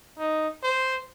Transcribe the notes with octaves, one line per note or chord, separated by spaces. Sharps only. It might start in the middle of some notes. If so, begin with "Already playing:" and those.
D#4
C5